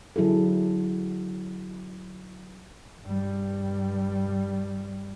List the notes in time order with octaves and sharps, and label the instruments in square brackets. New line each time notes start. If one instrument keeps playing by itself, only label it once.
[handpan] D3 F#3 E4 G#4 A4
[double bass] G2 G3